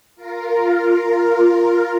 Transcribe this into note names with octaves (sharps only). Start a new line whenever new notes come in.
F4 A#4